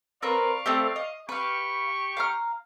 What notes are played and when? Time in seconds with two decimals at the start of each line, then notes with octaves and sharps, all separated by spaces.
0.22 C4 A#4 B4 D5 F5 C#6
0.66 A3 C4 G4
0.96 D#5
1.29 G4 B4 F5 C#6
2.17 F5 A#5 F6